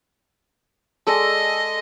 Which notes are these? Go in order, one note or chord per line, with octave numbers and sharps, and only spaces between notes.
G#3 A4 D5 D#5